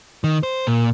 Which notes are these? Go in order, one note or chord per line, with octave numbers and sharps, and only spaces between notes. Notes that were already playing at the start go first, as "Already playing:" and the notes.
D#3
C5
A#2